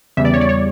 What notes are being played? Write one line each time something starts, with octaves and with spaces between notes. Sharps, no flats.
E2 C#3 G3 E5
D5
C#5
D5
C#5